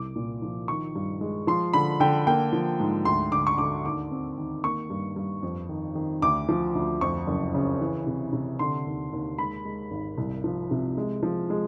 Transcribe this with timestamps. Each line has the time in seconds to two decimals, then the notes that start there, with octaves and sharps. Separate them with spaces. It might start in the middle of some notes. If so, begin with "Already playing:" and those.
Already playing: C2 D6
0.16 A#2
0.42 F3
0.68 D#3 C#6
0.95 G2
1.21 G#3
1.47 F3 C6
1.73 D3 B5
2.00 D3 G5
2.27 A#3 G5
2.53 F3
2.80 G#2
3.05 D2 C6
3.32 D3 D6
3.47 C#6
3.58 D3 D6
3.85 D#2 D6
4.11 C4
4.38 D#3
4.64 A#3 C#6
4.90 G2
5.16 G2
5.43 F2
5.69 D#3
5.95 D#3
6.22 D2 D6
6.49 F3
6.75 D2
7.01 F2 C#6
7.27 F#1
7.55 C#3
7.81 E3
8.06 C3
8.33 C3
8.59 D3 C6
8.86 D#2
9.13 D#2
9.38 G#3 B5
9.65 G#3
9.91 G#1
10.18 C2
10.44 F3
10.71 C3
10.97 G#3
11.23 F3
11.50 G#3